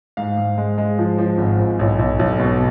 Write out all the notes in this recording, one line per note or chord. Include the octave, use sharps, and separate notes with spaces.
G#2 F5
G#2
G#3
G#3
F3
F3
G#1
G#1
B1
B1
B1
B2